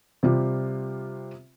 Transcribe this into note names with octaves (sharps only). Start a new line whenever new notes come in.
C3 G3 F4 G4